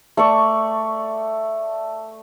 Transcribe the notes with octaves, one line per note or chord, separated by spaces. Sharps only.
A3 D5 C#6